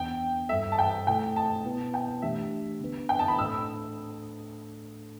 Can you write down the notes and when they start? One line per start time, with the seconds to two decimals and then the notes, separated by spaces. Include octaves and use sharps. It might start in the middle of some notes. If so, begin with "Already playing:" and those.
Already playing: E2 E3 B3 D4 G5
0.49 G2 G3 E4 A4 E5
0.72 A5
0.79 G5
1.07 B2 A3 E4 A4 G5
1.36 A5
1.64 B2 B3 E4 B4
1.94 G5
2.22 E3 A3 D4 G4 E5
2.81 D3 B3 D4 B4
3.09 G5
3.19 A5
3.28 B5
3.38 A2 A3 D4 A4 E6